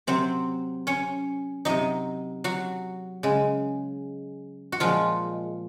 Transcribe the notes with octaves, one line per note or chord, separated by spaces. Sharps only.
C3 F#3 C4 C5
C#4 C#5
C3 F#3 D#4 D#5
F#3 F#4
C#3 G#3
F#4
A#2 F3 G#3 F4